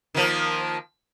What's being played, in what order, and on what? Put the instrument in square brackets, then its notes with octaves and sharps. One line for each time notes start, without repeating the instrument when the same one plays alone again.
[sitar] D#3 F3 A#3